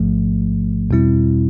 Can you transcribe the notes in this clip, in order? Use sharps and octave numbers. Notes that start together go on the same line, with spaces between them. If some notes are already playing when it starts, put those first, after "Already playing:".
Already playing: A1 G#2 F3 A3
E2 B2 G3 C4 E4